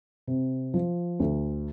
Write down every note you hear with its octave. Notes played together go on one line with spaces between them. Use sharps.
C3
F3
D2